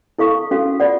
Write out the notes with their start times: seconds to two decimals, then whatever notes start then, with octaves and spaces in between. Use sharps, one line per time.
0.19 E4 A4 F5 C#6
0.51 C#4 F#4 A4 F5
0.80 F4 D5 F#5